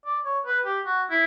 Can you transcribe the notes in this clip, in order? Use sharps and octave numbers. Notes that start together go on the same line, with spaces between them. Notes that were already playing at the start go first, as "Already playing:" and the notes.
D5
C#5
B4
G4
F#4
E4